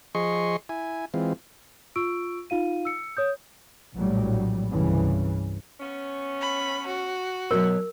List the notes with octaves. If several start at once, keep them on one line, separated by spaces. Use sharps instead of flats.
F3 G#4 D#5 C6 C#6
E4 G#5
E3 G#3 C4 F4
F4 C#6 E6 D7
D#4 F4 F5 D#7
E6 C#7
C#5 D#6 G6
A#1 A2 F#3 G3
C2 G2 C#3 E3
B3 C#4
B5
F#4
B2 F#3 A#4